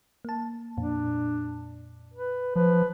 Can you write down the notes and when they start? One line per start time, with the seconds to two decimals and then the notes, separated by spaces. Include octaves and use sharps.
0.25 A#3 A5
0.77 F2 A#2 D4
2.14 B4
2.55 F3 B4